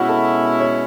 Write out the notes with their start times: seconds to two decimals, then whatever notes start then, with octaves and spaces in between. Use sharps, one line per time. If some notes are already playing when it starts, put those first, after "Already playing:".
Already playing: B2 G#3 C#4 E4 F#4
0.09 A4
0.60 C#5